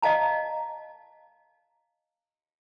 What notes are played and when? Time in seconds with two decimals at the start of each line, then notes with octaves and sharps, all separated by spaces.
0.02 D#5 F5 A5 A#5